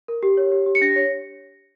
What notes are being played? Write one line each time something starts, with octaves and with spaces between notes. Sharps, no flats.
A#4
G4
C#5
G4
G4
C#7
D4 A#6
C#5